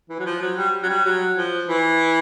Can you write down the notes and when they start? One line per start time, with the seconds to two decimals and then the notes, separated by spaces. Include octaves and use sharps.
0.10 E3
0.19 F#3
0.25 F3
0.41 F#3
0.57 G3
0.83 F#3
0.89 G3
1.05 F#3
1.37 F3
1.68 E3